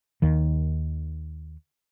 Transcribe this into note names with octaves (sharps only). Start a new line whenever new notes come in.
D#2 D#3